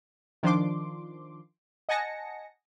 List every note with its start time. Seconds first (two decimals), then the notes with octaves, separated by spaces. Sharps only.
0.43 D#3 F3 D4 C6 D6
1.89 D#5 F#5 G#5 A5 A#6 C#7